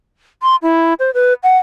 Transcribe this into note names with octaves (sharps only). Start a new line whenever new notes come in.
C6
E4
C5
B4
F#5